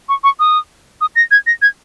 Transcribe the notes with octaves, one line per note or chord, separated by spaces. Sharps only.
C#6
C#6
D#6
D#6
A#6
G#6
A#6
G#6